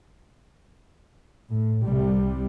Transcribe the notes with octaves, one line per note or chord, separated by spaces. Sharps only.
A2
C2 C3 G3